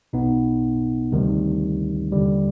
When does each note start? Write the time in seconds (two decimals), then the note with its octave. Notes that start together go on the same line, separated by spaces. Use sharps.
0.13 B1 B2 B3 D#4
1.12 D2 C3 D#3 G3
2.12 D#2 D3 G3